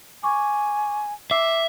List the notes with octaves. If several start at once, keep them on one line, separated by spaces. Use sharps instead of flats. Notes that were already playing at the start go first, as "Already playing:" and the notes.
G#5 C#6 D6
E5 D6 E6 C7